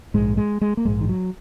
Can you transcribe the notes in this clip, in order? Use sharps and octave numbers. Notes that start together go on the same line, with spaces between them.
A#1 G#2 G#3
G#3
G#3
A#3
A#1 G#2 G#3
D#3
F#3